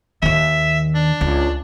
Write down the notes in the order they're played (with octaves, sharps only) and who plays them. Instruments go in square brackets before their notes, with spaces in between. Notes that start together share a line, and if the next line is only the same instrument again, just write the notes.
[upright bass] D#2 D#3 [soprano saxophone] E5
[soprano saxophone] D4
[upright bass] C#2